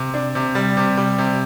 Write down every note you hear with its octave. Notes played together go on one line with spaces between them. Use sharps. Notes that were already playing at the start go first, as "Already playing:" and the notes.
Already playing: C3
D4
C3
G3
C3
G3
C3